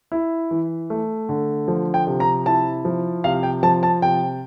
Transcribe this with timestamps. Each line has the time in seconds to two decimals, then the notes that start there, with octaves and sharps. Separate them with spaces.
0.12 E4
0.51 E3
0.90 A3
1.29 D3
1.68 F3
1.94 G5
2.07 C3
2.20 A#5
2.46 E4 A5
2.85 F3
3.24 C3 F5
3.43 G5
3.63 F3 A5
3.83 A5
4.02 C3 G5